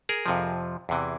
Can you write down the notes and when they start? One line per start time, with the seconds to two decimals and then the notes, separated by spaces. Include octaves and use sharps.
0.09 G#4 A#4
0.26 F2 C3 F3
0.89 E2 C3 E3